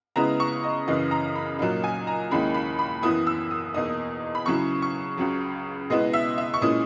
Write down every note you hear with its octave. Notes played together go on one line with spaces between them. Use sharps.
C#3 G#3 B3 E4 A#5
C#6
D#5
F#2 C#3 E3 D#5
A#5
B5
A#2 F#3 A#3 D#4
G#5
A#5
D#2 D#3 G#3 C#4 E4 B5
B5
B5
F#2 E3 B3 E4 D#6
E6
D#6
E2 B2 A#3 D#4 D#6
B5
C#3 F#3 C#4 E4 C#6
C#6
C#2 C#3 F#3
B2 G#3 B3 E4 D#5
E5
E5
C#6
A#2 G#3 C#4 E4 D#6